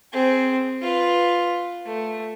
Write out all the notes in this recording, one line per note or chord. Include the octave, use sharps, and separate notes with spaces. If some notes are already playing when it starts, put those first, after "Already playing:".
C4 G#4
F4 B4
A3